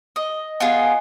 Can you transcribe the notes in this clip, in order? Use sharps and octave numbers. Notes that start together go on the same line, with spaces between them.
D#5
B3 F4 G#4